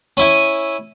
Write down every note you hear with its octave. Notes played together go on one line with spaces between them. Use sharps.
C#4 E4 G#5